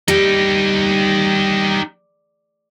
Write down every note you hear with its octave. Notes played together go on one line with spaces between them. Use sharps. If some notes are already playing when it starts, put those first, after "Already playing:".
G3 D#4 G4